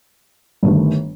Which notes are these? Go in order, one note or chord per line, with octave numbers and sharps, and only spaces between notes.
G1 G2 D#3 A3